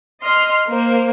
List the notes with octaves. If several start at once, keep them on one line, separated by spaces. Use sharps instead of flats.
D#5 C6 F6
A#3 C5